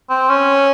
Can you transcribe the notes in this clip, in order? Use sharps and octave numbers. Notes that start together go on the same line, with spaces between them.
C4
C#4